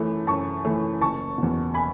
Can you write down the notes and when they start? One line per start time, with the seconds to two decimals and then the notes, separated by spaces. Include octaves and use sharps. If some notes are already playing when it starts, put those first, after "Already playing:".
Already playing: F#2 E3 A3
0.27 F#2 A5 C#6
0.65 E3 A3
1.01 F#1 A5 C#6
1.38 E2 B2
1.74 G#5 B5